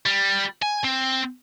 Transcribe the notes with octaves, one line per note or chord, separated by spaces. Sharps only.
G3
G#5
C4